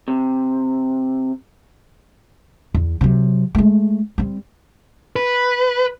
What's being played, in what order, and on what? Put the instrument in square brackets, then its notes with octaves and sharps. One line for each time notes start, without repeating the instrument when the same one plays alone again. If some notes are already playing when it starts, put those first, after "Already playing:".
[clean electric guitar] C3
[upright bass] E2
C3 F#3
G#3 A3
G3 C4
[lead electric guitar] B4